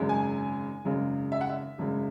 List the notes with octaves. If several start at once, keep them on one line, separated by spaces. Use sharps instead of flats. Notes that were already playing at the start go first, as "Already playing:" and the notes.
Already playing: G#1 F#2 C#3 G#3
G#5
G#1 F#2 C#3 G#3
E5
F#5
E5
G#1 F#2 C#3 G#3